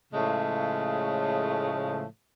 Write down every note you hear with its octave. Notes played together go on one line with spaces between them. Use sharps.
A2 C#3 F3 G#3 A3